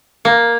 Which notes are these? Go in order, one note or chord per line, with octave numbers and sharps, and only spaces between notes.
A#3